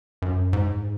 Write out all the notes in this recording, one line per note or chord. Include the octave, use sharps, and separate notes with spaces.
F#2
G#2